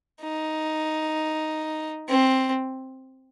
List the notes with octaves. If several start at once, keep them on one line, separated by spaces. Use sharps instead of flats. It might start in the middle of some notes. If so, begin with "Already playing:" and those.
D#4
C4